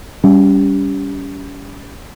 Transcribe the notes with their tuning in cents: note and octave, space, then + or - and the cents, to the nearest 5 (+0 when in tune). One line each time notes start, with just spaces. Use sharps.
G3 +0 C#4 +30